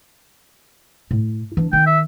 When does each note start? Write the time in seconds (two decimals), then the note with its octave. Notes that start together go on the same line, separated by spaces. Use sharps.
1.11 A2
1.57 E3 D4
1.73 D#3 G5
1.86 E5